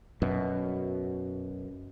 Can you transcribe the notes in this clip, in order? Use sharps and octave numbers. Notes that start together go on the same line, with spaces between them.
F#2 B2